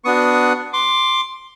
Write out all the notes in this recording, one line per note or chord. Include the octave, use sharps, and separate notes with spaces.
B3 D4 F#4 C#6 D#6
C6 D6